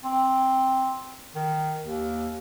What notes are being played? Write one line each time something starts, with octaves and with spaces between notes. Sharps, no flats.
C4
D#3
D#2